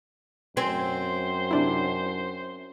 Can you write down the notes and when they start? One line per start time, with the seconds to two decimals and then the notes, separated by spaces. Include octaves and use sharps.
0.57 F#2 C4 C5 G#5
1.51 C3 D4 E4